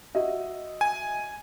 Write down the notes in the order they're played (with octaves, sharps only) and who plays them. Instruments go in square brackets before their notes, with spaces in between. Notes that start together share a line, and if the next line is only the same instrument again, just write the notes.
[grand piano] F#4 D#5 E5
[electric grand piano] G#5